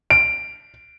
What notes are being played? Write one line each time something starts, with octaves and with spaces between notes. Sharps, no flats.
D7